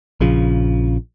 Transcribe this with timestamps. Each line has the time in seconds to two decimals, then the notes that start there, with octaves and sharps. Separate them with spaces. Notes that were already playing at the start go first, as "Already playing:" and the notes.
0.21 A#1 C#3 F3